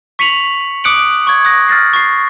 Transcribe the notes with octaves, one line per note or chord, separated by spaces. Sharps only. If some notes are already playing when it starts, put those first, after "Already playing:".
C#6 B6 C#7 D#7 F7 F#7
D6 D#6 F#6 C#7 D7 F#7
C#6 G#6
D#6 F#6 A#6
F6 A6 A#6 C7
C#6 C7